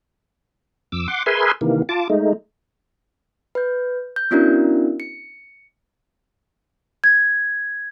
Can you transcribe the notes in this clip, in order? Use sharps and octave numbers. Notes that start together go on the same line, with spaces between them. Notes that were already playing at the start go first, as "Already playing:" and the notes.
F2 D6 E6
F#5 C6 D6
G#4 A#4 B4 E5 G#5 C6
C3 D#3 E3 A#3
F4 A5 D6
G#3 A3 D#4
B4 G6
G6
B3 C#4 D4 E4 F#4 A#4
C#7
G#6